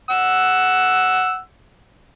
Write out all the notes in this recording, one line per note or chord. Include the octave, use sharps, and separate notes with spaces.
F#5 E6